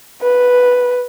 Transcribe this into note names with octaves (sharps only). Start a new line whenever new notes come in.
B4